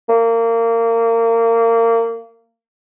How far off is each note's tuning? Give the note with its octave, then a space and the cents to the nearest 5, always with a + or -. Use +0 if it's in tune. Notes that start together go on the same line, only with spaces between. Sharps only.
A#3 -25